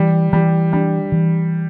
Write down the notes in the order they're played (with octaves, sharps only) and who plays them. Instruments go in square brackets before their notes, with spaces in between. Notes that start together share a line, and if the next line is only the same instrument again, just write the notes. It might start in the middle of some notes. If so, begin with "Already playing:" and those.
Already playing: [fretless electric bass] E3 [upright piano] G3
[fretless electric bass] E3 [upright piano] G3
[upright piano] G3 [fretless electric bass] D4
[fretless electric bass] E3